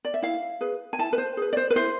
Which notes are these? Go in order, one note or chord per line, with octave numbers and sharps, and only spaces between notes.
D5
E5
E4 F5
G#4 B4
G#5
E4 A5
B4
C5
G#4 B4
D5
C5
B4
E4 C5